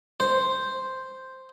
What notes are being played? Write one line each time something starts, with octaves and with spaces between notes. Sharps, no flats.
C5